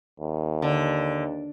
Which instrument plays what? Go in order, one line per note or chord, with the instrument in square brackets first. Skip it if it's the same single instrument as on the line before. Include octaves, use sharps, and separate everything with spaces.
[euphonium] D#2
[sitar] D3